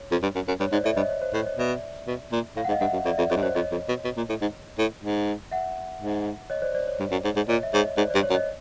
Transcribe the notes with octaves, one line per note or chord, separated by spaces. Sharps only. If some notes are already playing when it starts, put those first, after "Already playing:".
Already playing: C#5
F2
G2
F#2
F#2
G2 C#5
G#2 C5 D5
A2 D5 E5
G2 C#5 D#5
C#5
C5
A2 C#5
C#5 D#5
B2 D5 E5
B2
A#2
A2 F5
F#5
G#2
D#5 F5
G2 E5 F#5
F#2
F2 D5 E5
F2 D5 E5
F2 C#5 D#5
G2
F#2 C5 D5
F2 C#5 D#5
F2
B2
B2
A#2
A2
G#2
A2
G#2
E5 F#5
G#2
C#5 D#5
C5 D5
C5 D5
C#5
G2
F#2
G#2
G#2
A#2 C#5 D#5
E5
G#2 C#5 D#5
G#2 C5 D5
G2 C5 D5
C#5
F#2
C#5 D#5